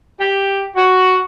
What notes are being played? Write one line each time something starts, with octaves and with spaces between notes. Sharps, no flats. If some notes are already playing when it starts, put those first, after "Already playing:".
G4
F#4